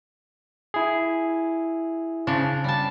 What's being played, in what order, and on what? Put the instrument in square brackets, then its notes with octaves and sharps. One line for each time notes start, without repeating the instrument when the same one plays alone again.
[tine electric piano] E4 G#4
[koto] C#3 F3 D4
G3 A5